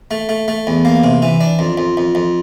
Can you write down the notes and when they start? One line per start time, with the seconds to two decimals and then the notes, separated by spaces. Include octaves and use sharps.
0.11 A3
0.29 A3
0.48 A3
0.67 E2
0.85 A#3
1.04 C3
1.22 E3
1.41 D4
1.59 F2
1.78 F2
1.97 F2
2.15 F2